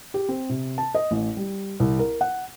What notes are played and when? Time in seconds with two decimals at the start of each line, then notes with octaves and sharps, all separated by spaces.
0.14 G4
0.29 C4
0.49 C3
0.78 A5
0.95 D#5
1.11 A1
1.37 G3
1.80 C2
1.99 A#4
2.21 F#5